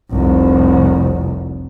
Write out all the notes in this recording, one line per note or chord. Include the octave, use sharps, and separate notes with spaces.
F1 C2